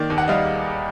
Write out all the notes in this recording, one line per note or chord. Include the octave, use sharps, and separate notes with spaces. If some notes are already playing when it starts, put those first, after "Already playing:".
Already playing: D#3 A#3 D5
D#2
F#5
G3 D#5 F5